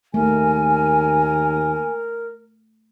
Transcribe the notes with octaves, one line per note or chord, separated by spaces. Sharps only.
D#2 A3 A#4 G#5